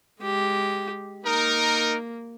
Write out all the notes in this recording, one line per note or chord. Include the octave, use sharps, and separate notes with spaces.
G#3 G4
A#3 D#4 A#4